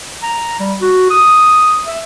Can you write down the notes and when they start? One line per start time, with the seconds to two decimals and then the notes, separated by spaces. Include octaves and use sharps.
0.22 A#5
0.60 G3
0.81 F#4
1.10 D#6
1.86 E5